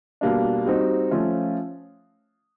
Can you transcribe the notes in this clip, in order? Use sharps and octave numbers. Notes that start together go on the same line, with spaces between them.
B2 G3 A#3 D4
G3 C4 D#4 F#4
F3 A3 C#4 F4